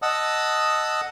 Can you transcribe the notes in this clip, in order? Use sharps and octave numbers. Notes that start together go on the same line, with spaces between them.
D#5 F#5 A5 D#6 E6